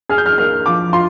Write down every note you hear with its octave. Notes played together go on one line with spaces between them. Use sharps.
G#4 F6
G6
F6
A#3 F6
F3 D6
F4 C6